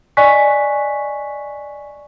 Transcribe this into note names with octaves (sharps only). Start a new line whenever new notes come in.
D5 D#5 G#5 C#6 F#6 B6